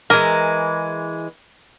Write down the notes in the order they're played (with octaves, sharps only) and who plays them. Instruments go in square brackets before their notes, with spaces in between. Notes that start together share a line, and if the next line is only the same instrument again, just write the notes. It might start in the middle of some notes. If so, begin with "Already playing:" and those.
[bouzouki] E3 G#3 [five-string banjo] A#4